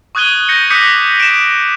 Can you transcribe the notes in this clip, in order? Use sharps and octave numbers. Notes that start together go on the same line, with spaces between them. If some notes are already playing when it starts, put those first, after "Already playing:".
C#6 D#6 F#6 G#6 D#7 G7
G6 A#6 C#7
D6 D#6 F#6 G6 B6 C#7
D7 E7